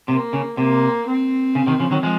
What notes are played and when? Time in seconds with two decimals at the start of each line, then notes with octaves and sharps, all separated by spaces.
0.08 C3 A#3
0.33 C#3
0.57 C3 A#3
1.06 C4
1.55 C#3
1.67 C3 D#3
1.80 C#3 F3
1.91 D#3 F#3
2.03 F3 G#3